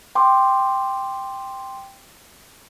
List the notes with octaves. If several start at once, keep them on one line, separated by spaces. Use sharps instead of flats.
G5 C6 D6